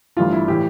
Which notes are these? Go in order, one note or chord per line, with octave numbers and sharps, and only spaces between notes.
G1 G2 E3 A3 F4
E4
A2 E3 G4